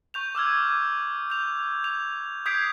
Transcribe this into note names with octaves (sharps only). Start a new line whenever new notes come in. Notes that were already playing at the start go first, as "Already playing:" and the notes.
C#6 G6 F7
D6 E6 F6 G#6
G6 F7
F7
D#6 G6 G#6 B6 C7 D7